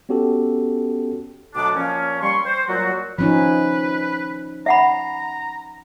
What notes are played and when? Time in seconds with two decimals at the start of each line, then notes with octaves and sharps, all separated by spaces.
0.09 B3 C#4 F#4 G4 A4
1.55 D2 B2 F#3 B3 D4 D6
1.75 A#2 F3 A#3 C#4
2.21 G3 C6 C#6
2.45 C5
2.68 A#2 F#3 G3 F#4
3.18 F3 C#4 D#4 B4
4.66 E5 F#5 A#5 B5